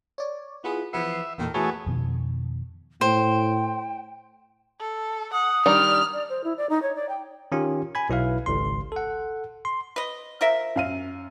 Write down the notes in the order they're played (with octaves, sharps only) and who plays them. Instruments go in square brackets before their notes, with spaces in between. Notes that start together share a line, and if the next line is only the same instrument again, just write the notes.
[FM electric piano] C#5 D5
[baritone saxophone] B3 [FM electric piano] E4 F4 G#4
[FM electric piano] E3 F3 C7 [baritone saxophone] B3 [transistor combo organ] E5
[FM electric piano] E2 A#2 A4 [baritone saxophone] D#3
[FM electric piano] E3 A3 F#4 [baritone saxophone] B3 [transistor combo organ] G#4 A4 C#5
[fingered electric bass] F2 B2 D#3
[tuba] A2 [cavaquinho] C5 [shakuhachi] G5
[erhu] A4
[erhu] F#5 [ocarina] D#6
[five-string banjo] D#3 G3 D4 [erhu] F6
[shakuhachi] D5
C5
E4
D5
D#4
C#5
D5
G5
[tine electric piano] D#3 C#4 F4 G4
G#5 B5 G#6
B1 E4 B4 F5
G#1 C#2 C6
A4 F#5
C6
[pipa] B4 D#5
F3 A#4 E5
[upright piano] F#2 F5 D#7